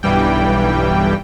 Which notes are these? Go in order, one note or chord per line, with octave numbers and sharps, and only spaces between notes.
B1 G2 E3 G3 G5